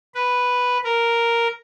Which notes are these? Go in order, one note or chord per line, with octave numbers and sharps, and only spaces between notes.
B4
A#4